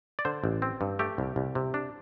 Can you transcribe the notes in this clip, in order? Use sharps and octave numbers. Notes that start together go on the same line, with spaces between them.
D5
D3 C5
A1
C4
G2
A3 G4
C2
C2
C3
D4